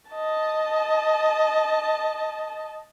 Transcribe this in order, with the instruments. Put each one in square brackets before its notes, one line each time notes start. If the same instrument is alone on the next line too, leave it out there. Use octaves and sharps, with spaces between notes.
[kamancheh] D#5 A5